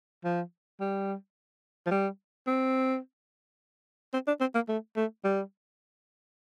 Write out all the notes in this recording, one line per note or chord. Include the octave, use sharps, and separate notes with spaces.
F3
G3
F3
G3
C4
C4
D4
C4
A#3
A3
A3
G3